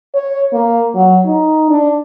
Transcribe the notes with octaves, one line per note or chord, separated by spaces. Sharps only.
C#5
A#3
F#3
D#4
D4